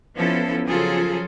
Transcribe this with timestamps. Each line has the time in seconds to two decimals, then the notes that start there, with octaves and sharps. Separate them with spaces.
0.16 F3 B3 C#4 E4 A4
0.65 C#3 F3 F#3 F4 G#4 A4